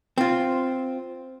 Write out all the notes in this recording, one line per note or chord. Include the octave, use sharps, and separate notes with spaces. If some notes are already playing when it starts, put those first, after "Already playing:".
C4 F4